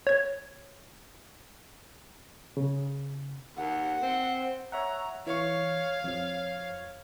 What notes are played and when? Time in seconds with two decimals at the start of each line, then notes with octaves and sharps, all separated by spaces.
0.07 C#5 G#6
2.57 C#3
3.57 D#2 F#5
4.02 C4
4.72 C#5 E5 F#5 A#5
5.27 E3 C#5 F5 C#6
6.04 F2 F3 C#5